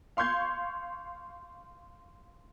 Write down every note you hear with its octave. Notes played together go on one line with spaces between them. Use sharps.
F5 C6 C#6 G6 G#6